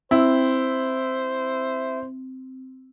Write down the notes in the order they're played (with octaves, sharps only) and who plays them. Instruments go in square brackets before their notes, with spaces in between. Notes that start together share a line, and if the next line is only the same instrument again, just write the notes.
[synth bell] C4 [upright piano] E4 [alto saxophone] C5